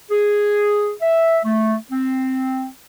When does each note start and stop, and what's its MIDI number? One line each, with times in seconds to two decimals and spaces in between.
0.10 0.92 68
1.02 1.39 76
1.45 1.76 57
1.91 2.69 60